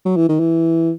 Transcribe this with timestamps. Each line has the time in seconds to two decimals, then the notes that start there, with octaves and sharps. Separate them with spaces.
0.05 F#3
0.17 E3
0.29 D#3
0.40 E3